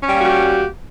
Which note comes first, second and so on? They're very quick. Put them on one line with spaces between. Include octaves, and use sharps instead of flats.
C#4 G3 A#3 F#4 G4